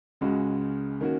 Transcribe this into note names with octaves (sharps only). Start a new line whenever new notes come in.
C#2 C#3 G#3 F#4
D#3 A#3 C#4 F#4